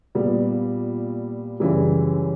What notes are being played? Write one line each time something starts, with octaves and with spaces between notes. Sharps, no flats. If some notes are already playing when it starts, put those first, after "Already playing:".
A#2 G3 B3
F#2 C#3 E3 G3